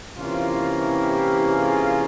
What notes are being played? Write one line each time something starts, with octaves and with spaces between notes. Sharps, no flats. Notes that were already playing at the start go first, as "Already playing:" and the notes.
C3 E3 A#3 C#4 F4
E4 G4
F4 G#4